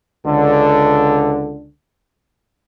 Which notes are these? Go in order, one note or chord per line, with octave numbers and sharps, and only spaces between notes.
C#2 D3